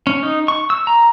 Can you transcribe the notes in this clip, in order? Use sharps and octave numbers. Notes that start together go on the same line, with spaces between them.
C#4
D#4
C#6
E6
A#5